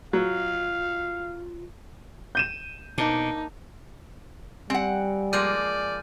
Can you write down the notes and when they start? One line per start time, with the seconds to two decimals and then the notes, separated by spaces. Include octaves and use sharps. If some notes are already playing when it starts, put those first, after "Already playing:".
0.13 F#3 F4 F5
2.35 G6 D#7 E7
2.98 B2 A#3 D4 D#4
4.70 G3 C4 F#5 G#5
5.33 F3 G#3 A#3 D5 F6 G6 D#7